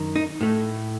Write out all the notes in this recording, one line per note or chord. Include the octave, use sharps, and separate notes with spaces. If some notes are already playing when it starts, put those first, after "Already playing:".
Already playing: F#2 D#3
D#4
A2 A3